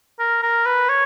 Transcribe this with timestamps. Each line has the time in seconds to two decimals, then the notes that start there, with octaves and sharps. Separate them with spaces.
0.19 A#4
0.42 A#4
0.66 B4
0.89 C#5